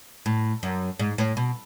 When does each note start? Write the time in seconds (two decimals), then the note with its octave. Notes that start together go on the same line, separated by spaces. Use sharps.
0.26 A2
0.63 F#2
0.99 G#2
1.18 A2
1.37 B2